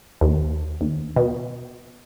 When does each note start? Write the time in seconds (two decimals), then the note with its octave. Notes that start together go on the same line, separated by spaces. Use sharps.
0.21 D#2
0.81 D#2
1.16 B2